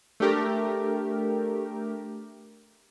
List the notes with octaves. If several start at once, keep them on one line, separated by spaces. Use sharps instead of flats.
A3 D4 G4 A#4